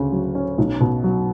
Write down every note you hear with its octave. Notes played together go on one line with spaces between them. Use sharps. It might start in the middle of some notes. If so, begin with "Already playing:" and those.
Already playing: D2 C#3 C#4
F#3
C#4
B1
B2
F#3